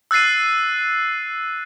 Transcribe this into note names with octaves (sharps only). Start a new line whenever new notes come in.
E6 F#6 A6 C7 D#7